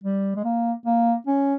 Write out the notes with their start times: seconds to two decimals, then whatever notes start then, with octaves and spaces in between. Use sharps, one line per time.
0.03 G3
0.36 G#3
0.44 A#3
0.86 A#3
1.27 C#4